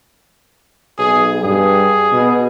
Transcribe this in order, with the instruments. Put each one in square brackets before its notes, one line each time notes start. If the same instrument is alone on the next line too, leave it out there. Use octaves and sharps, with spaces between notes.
[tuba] B1 [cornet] G#4
[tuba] G2 [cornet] G#4
[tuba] B2